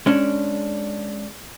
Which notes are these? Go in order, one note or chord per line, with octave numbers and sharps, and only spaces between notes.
G#3 C#4 D4